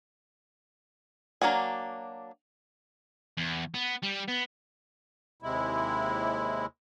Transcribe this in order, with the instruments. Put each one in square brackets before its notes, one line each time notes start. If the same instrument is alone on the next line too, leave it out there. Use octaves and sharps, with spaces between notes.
[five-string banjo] F#3 A#3 D4 F#4 G#5
[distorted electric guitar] E2
B3
G3
B3
[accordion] D#2 C3 G#3 E4